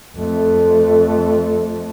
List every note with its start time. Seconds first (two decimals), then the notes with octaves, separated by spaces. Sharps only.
0.17 F2 A3